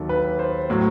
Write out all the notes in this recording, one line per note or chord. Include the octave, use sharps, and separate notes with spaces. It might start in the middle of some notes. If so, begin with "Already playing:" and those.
Already playing: D#2 D#3 F#3 A4
B4
C5
A2 F#3